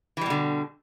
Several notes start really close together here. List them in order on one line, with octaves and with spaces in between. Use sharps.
E3 G3 B2 D3